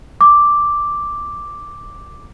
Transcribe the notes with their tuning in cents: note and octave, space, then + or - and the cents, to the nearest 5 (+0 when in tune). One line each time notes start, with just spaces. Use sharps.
D6 +0